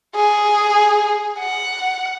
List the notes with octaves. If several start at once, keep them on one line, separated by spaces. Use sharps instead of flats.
G#4
F#5